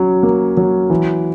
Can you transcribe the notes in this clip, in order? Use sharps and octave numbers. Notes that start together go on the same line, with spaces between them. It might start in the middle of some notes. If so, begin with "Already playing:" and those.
Already playing: F#3 C#4
A#3
F#3
E3